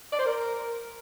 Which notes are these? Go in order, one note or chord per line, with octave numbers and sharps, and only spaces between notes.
D5
C5
A#4